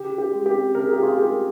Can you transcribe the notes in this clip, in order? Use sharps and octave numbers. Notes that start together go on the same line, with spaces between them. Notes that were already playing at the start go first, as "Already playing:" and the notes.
Already playing: C#3 G4
C#3
G4
G#3
G4
C4
C#3 A#4
G#4
C#3 G4
F4 G#4
G#3 G4 A#4